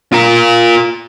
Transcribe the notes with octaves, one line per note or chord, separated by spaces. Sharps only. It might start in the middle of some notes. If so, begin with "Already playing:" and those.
F4 A#4